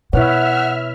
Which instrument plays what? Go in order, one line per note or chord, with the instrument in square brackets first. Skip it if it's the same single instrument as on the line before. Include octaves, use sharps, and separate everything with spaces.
[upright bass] B2 [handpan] E4 B4 C#5 [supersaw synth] E5 F6 [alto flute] F#5